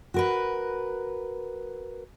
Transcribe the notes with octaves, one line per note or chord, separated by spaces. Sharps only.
F#4 A#4 B4